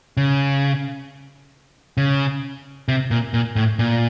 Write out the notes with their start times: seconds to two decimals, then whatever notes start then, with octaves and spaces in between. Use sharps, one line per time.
0.17 C#3
1.97 C#3
2.88 C3
3.11 A#2
3.34 A#2
3.56 A2
3.79 A#2